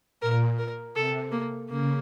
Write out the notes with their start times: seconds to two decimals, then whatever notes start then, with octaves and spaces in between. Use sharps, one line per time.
0.22 A#2 A#4
0.59 A#4
0.95 C3 A4
1.32 A#3
1.69 C#3 A#3